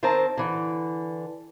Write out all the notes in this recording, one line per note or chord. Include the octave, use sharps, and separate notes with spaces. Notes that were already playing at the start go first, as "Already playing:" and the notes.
D#3 C4 A#4 C5 A5 A#5
D3 E3